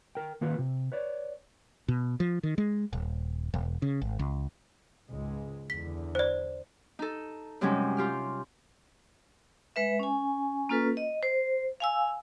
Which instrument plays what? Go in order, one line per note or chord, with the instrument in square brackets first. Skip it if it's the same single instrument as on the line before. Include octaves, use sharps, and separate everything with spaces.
[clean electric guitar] A#4 G5
D#3 A#3 F4 B4
C3
B4 C#5 D5
[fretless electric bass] B2
F3
D#3
G#3
D#1
E1
C#3
G#1
C#2
[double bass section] C#2 G#2 G#3
[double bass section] E2 D3 [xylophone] B6
[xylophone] C5 D5
[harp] D#4 A4
F#2 C3 G3 G#3 C#4 D#4
F4 G4 F6
[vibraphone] G#3 B4 E5
C#4 G#5
A#3 C#4 F4 A4 B4
D#5
C5
F5 G#5 E6